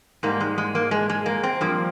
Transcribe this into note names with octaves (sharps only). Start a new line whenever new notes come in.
G#2 G3 A#3
G#3
G#3
A#3
G#3
G#3
A#3
C4
G2 F3 A#3